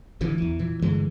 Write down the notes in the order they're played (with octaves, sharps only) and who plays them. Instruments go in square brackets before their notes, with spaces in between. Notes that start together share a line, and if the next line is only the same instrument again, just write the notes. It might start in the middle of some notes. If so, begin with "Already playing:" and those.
[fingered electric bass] A1 D3 E3
E2 E3
A#2 E3
G2 D3 E3 G#3